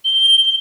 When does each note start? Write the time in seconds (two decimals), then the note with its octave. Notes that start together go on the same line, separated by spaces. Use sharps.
0.05 G7